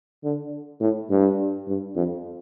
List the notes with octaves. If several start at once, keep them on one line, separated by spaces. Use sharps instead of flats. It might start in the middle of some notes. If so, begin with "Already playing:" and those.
D3
A2
G2
G2
F2